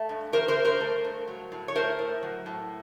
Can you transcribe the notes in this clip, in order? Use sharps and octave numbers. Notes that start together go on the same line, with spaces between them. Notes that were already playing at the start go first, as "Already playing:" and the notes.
Already playing: A3
G2
E3 A#4 C5
A#4 C5
G2
A#4 C5
A3
G2
F#3
A2
C#5
A3 A#4 C5
A2
F#3
A2